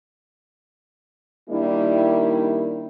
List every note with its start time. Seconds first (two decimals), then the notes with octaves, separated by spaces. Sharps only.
1.49 D#3 G3 A#3 D4 E4